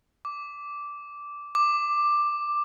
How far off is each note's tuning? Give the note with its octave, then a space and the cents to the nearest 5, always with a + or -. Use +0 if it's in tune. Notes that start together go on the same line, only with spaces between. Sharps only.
D6 -10
D6 +10